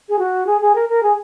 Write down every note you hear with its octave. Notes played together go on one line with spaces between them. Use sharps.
G#4
F#4
G#4
G#4
A#4
A#4
G#4